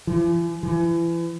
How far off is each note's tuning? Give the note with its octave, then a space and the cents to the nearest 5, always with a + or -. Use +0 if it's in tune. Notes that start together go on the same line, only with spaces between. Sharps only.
E3 +45
E3 +35